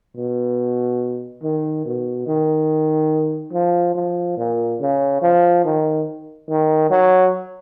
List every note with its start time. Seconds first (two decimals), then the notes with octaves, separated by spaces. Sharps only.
0.17 B2
1.43 D#3
1.85 B2
2.27 D#3
3.53 F3
3.95 F3
4.37 A#2
4.80 C#3
5.22 F3
5.64 D#3
6.49 D#3
6.90 F#3